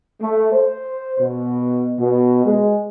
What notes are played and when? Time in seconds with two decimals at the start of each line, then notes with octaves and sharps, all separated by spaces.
0.20 A3
0.52 C5
1.19 B2
1.98 B2
2.44 G#3